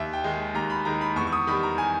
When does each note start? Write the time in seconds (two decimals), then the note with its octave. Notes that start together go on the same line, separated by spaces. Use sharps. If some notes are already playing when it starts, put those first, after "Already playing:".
Already playing: D#2 E5
0.13 G5
0.24 D#3 G#3
0.54 D#2 A#5
0.70 B5
0.85 D#3 G#3 A#5
1.01 B5
1.16 E2 C#6
1.27 C#6
1.32 D#6
1.47 D#3 G3 B5
1.63 A#5
1.78 G#5